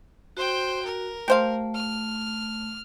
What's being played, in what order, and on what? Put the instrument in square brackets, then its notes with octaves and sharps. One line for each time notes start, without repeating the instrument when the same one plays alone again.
[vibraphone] F#4 [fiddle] C5 G5
[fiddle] A#4
[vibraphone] A3 [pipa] G4 C5 F5
[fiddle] F6